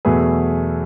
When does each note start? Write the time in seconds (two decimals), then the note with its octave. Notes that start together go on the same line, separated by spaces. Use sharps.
0.05 E2 B2 F#3 A3 G#4 B4